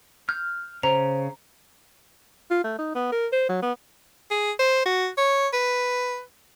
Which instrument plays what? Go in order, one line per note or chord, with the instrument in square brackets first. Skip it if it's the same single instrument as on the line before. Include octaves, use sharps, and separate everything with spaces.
[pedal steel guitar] F6 [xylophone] G6
[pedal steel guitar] C#3 [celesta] C5 [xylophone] A#5
[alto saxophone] F4
A3
D#4
B3
A#4
C5
F#3
B3
[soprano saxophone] G#4
C5
F#4
C#5
B4